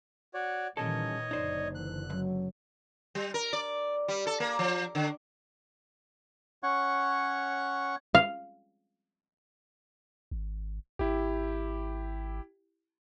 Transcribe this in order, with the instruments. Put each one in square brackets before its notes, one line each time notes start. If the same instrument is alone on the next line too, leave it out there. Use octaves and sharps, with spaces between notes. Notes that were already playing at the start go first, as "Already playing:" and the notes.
[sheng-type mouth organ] F#4 C#5 D5
[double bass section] A#2 D#3 E3 [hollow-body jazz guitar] G3 C#4 A4 [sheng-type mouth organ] C#5 D#5
[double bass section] F#1 D3 [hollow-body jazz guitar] D#4 C5 [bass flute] D5
[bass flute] E3 [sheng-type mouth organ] F#6
[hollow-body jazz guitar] C#2 F#2 [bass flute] F#3
[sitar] G3
A#4
D5
G3
A4
A#3
F3
D3
[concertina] C#4 C#5 F#5 C#6
[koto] F5
[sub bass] G#1
[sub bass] G#1 [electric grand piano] E4 G4